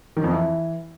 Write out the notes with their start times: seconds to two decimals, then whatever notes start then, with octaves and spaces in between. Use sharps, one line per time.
0.17 D#3
0.24 F2
0.31 E3